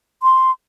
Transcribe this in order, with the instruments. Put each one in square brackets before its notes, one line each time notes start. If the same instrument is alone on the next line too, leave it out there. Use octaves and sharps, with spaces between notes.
[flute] C6